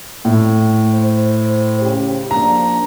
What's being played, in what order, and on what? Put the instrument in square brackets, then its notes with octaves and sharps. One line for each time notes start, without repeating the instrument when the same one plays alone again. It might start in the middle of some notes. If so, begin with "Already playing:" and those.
[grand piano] A2
[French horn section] C5
C#3 C#4 G4
[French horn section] F3 A#3 D4 [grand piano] A#5